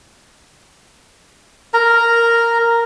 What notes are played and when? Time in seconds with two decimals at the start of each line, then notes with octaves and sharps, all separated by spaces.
1.74 A#4 A#5